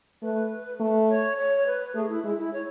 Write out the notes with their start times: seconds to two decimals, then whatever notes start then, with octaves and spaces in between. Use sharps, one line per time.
0.23 A3 B4
0.80 A3
1.09 C#5
1.38 C#5
1.66 B4
1.95 A3 G#4
2.09 E4
2.24 G#3 E4
2.38 E4
2.53 C#5